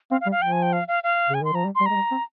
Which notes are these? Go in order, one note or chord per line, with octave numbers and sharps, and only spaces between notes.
C4 F5
F5
G3
F5
F3 G5
G#5
G5
F5
F5
F5
C#3
G#5
D#3 C6
F3 A#5
G3
C6
G3
G#3 A#5
G3
C4